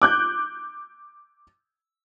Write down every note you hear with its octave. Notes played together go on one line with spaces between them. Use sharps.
D6 F#6 G6